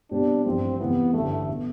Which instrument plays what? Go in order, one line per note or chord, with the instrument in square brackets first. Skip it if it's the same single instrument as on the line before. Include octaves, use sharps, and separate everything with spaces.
[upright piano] B2 G3 C4 G4 [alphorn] D4
[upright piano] A1 G2 F3 [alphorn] C4
[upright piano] E2 C3 E3 A3 E4 [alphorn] B3
[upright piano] A1 G2 D3 [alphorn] A3
[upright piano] B2 B3